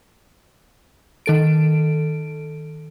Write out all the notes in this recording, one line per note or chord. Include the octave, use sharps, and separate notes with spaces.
D#3 A4 D7